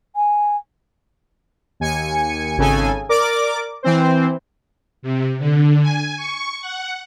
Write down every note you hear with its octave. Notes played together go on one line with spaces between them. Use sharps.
G#5
D#2 G#5 C#7
G#1 C#3 A4 G#5
A#4 D5 D6
E3 C4 C5
C3
D3
G#5
C#6
F#5